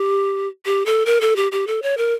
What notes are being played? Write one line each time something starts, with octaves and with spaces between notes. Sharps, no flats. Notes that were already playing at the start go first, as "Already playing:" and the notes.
Already playing: G4
G4
A4
A#4
A4
G4
G4
A4
C#5
A#4